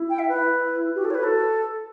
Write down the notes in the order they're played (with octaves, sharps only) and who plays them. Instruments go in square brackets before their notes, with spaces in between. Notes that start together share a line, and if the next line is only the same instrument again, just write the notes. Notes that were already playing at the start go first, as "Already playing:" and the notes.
Already playing: [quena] E4
[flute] G5
E5
B4
[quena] E4
[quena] F#4 [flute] G4
[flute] A4
[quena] E4 [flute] C#5
[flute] B4
[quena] E4
[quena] F#4 [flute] A4